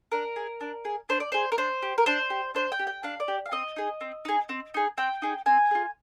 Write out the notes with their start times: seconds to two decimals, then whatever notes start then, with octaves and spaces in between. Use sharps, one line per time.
0.12 D4 A#4
0.36 G#4
0.61 D4
0.85 G#4
1.09 D4 C5
1.20 D5
1.32 G#4 C5
1.52 A#4
1.58 D4 C5
1.82 G4
1.98 A#4
2.06 D4 C5
2.30 G4
2.55 D4 C5
2.72 G5
2.79 G4
2.87 G5
3.03 D4 F5
3.20 D5
3.28 G4
3.46 F5
3.52 C4 D#5
3.76 D#4 G#4
4.01 C4
4.25 D#4 G#4
4.49 C4
4.74 D#4 G#4
4.98 C4 G5
5.22 D#4 G#4
5.46 C4 G#5
5.71 F4 G#4